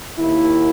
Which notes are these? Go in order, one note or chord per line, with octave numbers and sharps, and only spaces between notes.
D#2 D#3 A#3 E4